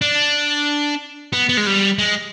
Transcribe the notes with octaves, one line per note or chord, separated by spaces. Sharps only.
D4
B3
B3
G#3
G3
G#3